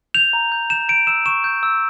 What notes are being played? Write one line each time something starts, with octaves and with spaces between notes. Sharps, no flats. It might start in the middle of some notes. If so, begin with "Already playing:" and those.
G6 F7
A#5
G6
G6 E7
G6 D7
E6 E7
C#6 E7
G6
E6